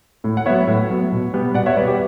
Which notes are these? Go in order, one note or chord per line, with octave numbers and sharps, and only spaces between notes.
A2
F#5
F#3 B3 C#5 E5
A2
F#3 B3
B2
G3 B3
B2 D5 F#5
C#5 E5
G3 B3 B4 D5
G4 B4